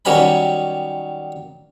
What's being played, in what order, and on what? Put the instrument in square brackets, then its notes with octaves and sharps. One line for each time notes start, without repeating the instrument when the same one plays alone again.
[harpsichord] D#3 F#3 G3 C#4 G#5 B5